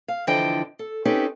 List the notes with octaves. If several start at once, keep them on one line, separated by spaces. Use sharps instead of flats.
F5
D3 E3 F3 D4 D#5 G5
A4
C4 C#4 D#4 G4 A4 B4